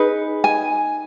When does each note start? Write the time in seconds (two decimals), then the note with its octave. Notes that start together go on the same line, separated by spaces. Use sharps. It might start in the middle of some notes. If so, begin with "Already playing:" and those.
Already playing: D#4 G#4 B4
0.44 G#5